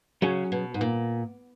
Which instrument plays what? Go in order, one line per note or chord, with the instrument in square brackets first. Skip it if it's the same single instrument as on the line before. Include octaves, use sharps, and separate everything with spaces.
[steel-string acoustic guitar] C#3 [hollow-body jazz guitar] F#3 C#4 G#4 C#5
[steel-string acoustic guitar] B2
G#2
A#2